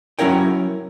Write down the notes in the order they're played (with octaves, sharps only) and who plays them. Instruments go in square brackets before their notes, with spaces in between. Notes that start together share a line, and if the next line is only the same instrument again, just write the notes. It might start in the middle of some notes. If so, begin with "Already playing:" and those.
[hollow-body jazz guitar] F#3 C#4 E4 A#4 C#5 G5